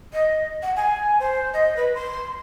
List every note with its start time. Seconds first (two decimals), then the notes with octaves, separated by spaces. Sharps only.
0.13 D#5
0.63 F#5
0.77 G#5
1.20 C5
1.53 D#5
1.77 B4
1.95 C6